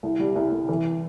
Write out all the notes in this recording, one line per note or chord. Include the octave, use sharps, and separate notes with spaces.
C2
G3
C2
C2
E3